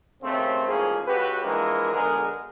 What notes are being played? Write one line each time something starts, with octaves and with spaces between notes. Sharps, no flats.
D#2 C#3 A3 C4
A1 G#2 F3 A#3 C#4 G#4
C#2 C#3 F#4 G4 B4
E3 F3 G#3 A#3 D4 A#4
B1 D3 G#3 B3 G#4 A#4